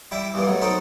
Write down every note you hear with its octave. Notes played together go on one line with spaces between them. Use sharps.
G3 E4 E5 G5 D6
E2 G2 E3 G3 A#3
B2 F#3 A3
C4 D#4 F#4 A4 A#4 C5